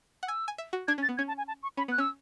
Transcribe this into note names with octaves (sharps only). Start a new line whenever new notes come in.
F#5
G#5 E6
G#5
E5
F#4
D4 G#6
C#4
A6
B3
C#4 G#6
A5
G#5
A5
C#6
C#4 B5
B3
F#6
C#4 E6